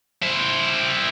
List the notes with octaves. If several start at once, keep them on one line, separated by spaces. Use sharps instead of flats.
E4 C5